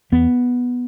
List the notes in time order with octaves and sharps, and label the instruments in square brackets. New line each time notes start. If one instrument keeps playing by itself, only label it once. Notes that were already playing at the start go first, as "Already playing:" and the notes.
[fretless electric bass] E2 B3